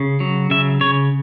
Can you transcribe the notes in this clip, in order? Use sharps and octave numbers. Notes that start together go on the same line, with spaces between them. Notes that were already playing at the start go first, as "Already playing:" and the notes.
Already playing: C#3
F#3
C#3 E5
C#3 C#5